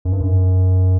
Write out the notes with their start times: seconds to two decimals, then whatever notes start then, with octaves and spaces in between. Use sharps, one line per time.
0.05 F#2
0.13 G2
0.20 F#2